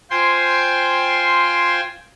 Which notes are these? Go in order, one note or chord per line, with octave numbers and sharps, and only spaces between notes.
F4 C5 G5 G#5 C6